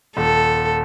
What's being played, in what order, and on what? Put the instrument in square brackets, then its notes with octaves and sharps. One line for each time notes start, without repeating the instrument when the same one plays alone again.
[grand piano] D#1 [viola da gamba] A4